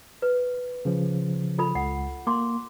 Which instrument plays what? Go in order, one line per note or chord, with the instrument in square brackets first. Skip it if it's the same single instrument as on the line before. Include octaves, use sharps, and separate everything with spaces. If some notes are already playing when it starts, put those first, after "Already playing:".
[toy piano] B4
[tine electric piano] C#3 F3
[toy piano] F4 A4 B5
[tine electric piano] C#2 [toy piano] F#5
[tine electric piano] A#3 [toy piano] C6 D6